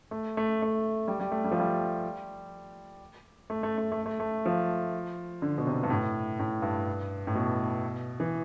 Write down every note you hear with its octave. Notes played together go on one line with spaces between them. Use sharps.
A3
A3
A3
G3
G3
A3
G3
F3
G3
A3
A3
A3
A3
A3
A3
F3
D3
B2
C3
G2
A2
A2
G2
A2
B2
E3